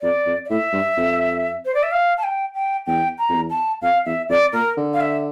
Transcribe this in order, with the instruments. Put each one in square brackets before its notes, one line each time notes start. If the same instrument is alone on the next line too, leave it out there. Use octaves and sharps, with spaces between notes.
[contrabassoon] F2 [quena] D5
[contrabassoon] F2
[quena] D5
[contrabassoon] A2 [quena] E5
[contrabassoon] G2
F2
[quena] C5
D5
E5
F5
A5
G5
G5
[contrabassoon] E2 [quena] G5
[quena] A#5
[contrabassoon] F2
E2
[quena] A5
[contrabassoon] F2 [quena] F5
[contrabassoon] E2 [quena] E5
[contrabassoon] F2 [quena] D5
[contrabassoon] A#2 [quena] A#4
[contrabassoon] D3
[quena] F5
E5